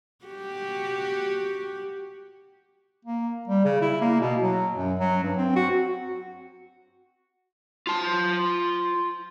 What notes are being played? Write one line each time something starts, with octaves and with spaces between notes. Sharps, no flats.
F#4 G4
A#3
G3
C#3
E4
A#3
B2
F#3
F#2
F#3
G2
C4
F#4
F4 A5